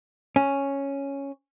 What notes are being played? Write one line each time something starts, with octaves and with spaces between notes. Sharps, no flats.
C#4